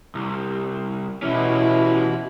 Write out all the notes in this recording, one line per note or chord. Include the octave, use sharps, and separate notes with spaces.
C2
B2 E3 C#4 E4